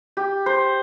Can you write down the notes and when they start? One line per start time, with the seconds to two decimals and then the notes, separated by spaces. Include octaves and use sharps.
0.17 G4
0.46 C5